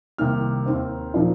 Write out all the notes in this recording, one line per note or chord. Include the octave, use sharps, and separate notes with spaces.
C2 C3 D#3 A#3 F6
D#2 D#3 C4
A#2 F3 D#4